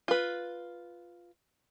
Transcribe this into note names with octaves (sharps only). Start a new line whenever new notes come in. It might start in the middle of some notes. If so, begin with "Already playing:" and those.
F4 B4